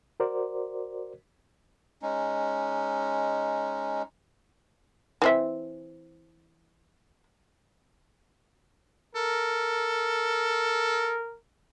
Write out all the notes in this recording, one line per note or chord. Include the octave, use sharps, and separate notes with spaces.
F#4 A#4 C5 D5
G#3 C#4 D#4
E3 C4 E5
A4 A#4